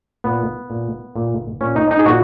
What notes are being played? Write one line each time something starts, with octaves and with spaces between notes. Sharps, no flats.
A#2 B3
A#2
A#2
A#2 C#4
D#4
D#4
G#4
A#2 F#4